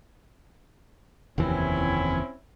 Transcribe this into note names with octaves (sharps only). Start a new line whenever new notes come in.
F1 D#2 E3 C4 C#4 E4